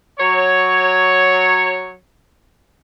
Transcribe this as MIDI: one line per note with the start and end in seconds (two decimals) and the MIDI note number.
0.19 1.94 54
0.19 1.94 73